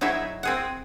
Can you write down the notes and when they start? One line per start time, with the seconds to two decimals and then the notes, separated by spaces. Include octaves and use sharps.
0.01 F#3 D#4 E4 G#4 E5
0.43 C4 G#4 F#5